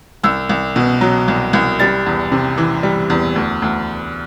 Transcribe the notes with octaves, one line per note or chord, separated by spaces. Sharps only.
C2 E6
C2
B2
F#3
C2
C2
G3 A6
E2
C3
E3
G3
E2
D2
D2